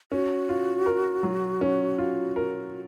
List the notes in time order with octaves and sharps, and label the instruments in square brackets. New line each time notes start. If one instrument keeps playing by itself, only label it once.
[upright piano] C#4 [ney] F#4
[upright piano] F4
A#4
F#3
C#4
F4
A#4